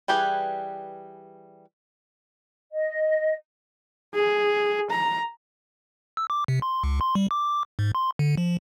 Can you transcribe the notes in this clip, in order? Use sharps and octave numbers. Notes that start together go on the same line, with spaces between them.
E3 G3 G4 G#4 B4
D#5
G#4
A#5
E6
D6
C3
C6
C#2
C6
G3
D6
G#2
C6
D3
F3